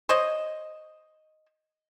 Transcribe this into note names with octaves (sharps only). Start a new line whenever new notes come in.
C5 C#5 D#5